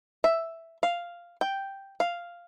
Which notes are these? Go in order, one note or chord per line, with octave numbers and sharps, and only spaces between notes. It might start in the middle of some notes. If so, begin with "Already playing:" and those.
E5
F5
G5
F5